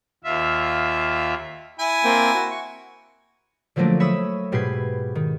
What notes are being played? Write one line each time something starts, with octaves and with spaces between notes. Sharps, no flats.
D#2 F4 E5
E4 G#5
A#3 C4 G5
F#4
C#6
D3 F3 F#3 A3 A#3 D4
C#5 E5 B5 D#6 E6
G#2 B2 G4 B4 G#6 C7
D#3